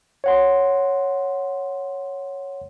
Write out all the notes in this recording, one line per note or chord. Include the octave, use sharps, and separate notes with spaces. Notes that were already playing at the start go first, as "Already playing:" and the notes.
C#5 F#5 C6